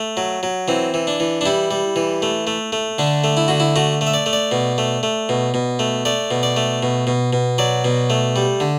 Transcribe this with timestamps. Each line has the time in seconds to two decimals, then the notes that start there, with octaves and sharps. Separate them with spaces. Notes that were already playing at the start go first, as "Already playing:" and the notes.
Already playing: A3
0.17 F#3
0.43 F#3
0.68 E3 C4
0.94 E3
1.07 D4
1.20 E3
1.41 D4
1.46 G3 E4
1.71 G3
1.96 E3
2.22 A3
2.47 A3
2.72 A3
2.99 D3 D4
3.24 A3
3.37 E4
3.48 D3 F#4
3.60 E4
3.76 A3 F#4
4.01 A3
4.07 E5
4.14 D5
4.26 A3
4.33 D5
4.52 B2
4.78 A3
5.03 A3
5.29 B2
5.54 B2
5.79 A3
6.05 A3 D5
6.31 B2
6.43 D5
6.56 A3
6.83 B2
7.07 B2
7.33 B2
7.58 F#3 D5
7.85 B2
8.10 A3
8.36 G3
8.60 D3